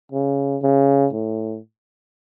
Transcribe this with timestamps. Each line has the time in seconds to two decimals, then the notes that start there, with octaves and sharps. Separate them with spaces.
0.12 C#3
0.62 C#3
1.13 A2